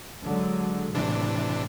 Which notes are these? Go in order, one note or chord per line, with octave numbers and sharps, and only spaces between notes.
D3 F#3 G#3
A2 C3 E3 D4